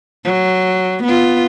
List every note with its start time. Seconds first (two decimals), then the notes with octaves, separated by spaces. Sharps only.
0.25 F#3
1.04 B3 F4